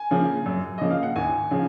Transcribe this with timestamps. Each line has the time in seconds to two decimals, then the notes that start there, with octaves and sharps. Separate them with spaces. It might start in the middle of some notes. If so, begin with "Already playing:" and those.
Already playing: G#5
0.11 C#3 F3 A#3
0.46 F#2
0.78 C#3 F3 A#3 D#5
0.90 F5
1.03 F#5
1.16 D#2 G#5
1.51 C#3 F3